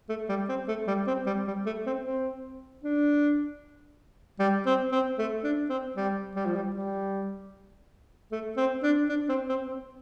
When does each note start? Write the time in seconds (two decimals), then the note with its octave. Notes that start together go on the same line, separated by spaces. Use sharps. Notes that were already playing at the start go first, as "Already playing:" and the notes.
0.09 A3
0.29 G3
0.49 C4
0.68 A3
0.87 G3
1.07 C4
1.26 G3
1.47 G3
1.66 A3
1.86 C4
2.05 C4
2.83 D4
4.39 G3
4.66 C4
4.92 C4
5.18 A3
5.44 D4
5.70 C4
5.96 G3
6.35 G3
6.46 F3
6.56 G3
6.74 G3
8.32 A3
8.57 C4
8.83 D4
9.09 D4
9.29 C4
9.49 C4
9.68 C4